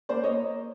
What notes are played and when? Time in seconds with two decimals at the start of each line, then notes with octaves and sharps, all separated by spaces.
0.09 A#3 C5 D5
0.23 A#3 C#5 D#5